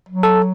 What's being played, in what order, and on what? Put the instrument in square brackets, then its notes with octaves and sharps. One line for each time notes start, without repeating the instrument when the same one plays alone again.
[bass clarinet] F#3
[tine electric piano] A4